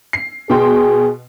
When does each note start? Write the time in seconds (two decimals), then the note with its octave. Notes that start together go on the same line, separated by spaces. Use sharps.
0.13 C7
0.50 B2 G#4 G5 C6